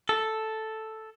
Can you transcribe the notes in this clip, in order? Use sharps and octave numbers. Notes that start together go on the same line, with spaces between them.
A4